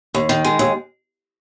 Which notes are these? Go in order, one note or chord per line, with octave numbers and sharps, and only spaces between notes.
D#2
D#3
G#3
D#2